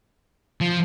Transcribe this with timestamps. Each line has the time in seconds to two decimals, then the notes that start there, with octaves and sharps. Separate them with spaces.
0.61 F3